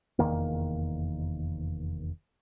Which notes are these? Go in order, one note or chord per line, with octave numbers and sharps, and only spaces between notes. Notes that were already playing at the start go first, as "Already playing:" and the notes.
F1 E2 D#3 A#3